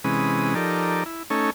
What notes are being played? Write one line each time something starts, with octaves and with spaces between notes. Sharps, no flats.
C3 E3 G#3 C#4 B4 D#6
F3 D#4 G4 A4 A#4 D5
E4
A3 C#4 D#4 A4 C#5